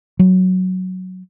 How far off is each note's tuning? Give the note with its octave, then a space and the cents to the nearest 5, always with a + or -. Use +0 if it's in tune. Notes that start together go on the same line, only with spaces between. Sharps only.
F#3 +0